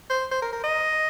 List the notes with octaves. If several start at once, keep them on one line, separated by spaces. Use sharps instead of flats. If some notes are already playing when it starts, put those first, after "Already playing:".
C5
C5
A#4
A#4
D#5